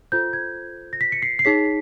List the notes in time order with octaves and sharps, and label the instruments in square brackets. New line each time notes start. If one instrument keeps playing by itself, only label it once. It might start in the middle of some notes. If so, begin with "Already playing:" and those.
[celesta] F4 A4 C5 G6
G#6
A#6
B6
C#7
C7
C7
D#4 G#4 C#5 B6